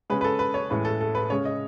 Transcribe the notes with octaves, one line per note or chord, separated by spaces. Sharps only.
C#3 G#3 C#4 B4
B4
A4
B4
C#5
A2 E3 G#3 C#4 B4
A4
A4
B4
C#3 G#3 C#4 C#5
D#5